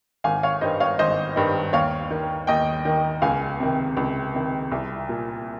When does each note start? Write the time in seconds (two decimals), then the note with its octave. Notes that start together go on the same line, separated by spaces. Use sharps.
0.24 G#1 F5 G#5
0.43 C#5 F5
0.61 G2 D#3 C5 D#5
0.80 C#5 F5
0.99 G#1 C5 D#5
1.36 G2 D#3
1.73 D#2 C#5 F5
2.11 D#3
2.47 D#2 D#5 G5
2.85 D#3
3.22 C#2 F5 G#5
3.60 C3 D#3
3.97 C#2
4.35 C3 D#3
4.72 C2
5.09 A#2